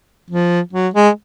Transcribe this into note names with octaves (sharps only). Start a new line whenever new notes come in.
F3
F#3
G#3